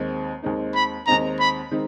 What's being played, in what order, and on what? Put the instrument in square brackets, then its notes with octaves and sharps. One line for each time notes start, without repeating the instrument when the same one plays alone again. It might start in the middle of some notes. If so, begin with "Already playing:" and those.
Already playing: [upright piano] D#2 D#3 G#3 C4 D#4
D#2 D#3 G#3 C4 D#4
[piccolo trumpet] B5
[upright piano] D#2 D#3 G#3 C4 D#4 [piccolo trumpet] A#5
[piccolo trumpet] B5
[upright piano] D#3 G#3 C4 D#4